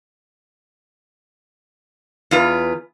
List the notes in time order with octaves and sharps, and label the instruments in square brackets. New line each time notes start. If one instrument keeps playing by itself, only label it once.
[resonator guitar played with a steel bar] E2 F4 B4